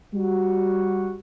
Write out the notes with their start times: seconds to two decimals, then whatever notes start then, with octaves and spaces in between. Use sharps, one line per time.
0.14 G3 F#4